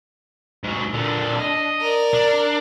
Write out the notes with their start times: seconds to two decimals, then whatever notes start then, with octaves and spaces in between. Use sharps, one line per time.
0.64 G#2 F#3
0.94 A#2 D3 D4
1.39 D#5
1.81 A#4 D5
2.13 D4